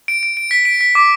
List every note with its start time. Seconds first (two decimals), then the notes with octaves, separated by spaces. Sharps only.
0.08 D7
0.23 D7
0.37 D7
0.51 B6
0.65 D7
0.81 B6
0.95 D6